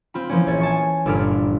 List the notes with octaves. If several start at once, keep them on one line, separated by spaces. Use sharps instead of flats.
C4 F4 B5
E3 F3 A#3 C4 C#4
A#1 C#5 G#6 A6
G#5 A5 C#6
G1 A#2 D4 B4 F6 D7